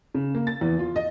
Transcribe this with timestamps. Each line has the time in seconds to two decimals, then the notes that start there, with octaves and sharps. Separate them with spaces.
0.15 C#3
0.35 A#3
0.47 A6
0.61 E2
0.79 F4
0.96 D#5